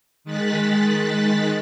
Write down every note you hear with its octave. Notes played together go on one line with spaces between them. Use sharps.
D#3 G#3 F#6 A6 B6